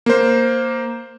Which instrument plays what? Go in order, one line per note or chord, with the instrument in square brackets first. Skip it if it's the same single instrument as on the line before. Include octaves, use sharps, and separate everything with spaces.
[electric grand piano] A#3 C5